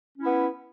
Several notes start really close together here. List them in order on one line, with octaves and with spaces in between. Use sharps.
C#4 E4 B3